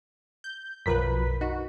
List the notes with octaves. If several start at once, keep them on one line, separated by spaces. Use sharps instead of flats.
G6
B1 F#2 F3 A#4 B4 B6
D#4 F#4